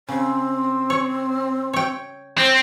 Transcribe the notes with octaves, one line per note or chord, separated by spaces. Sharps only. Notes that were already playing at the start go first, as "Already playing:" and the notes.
C#3 C4
C#5
C#5 G5
C4 C5